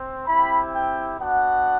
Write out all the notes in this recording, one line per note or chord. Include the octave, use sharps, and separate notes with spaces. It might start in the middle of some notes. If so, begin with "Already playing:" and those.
Already playing: C4
C4 E4 G4 B5
G5
B3 D4 F#4 F#5